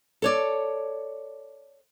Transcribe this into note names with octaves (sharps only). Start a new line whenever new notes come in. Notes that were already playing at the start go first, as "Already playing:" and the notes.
A4 C#5 D5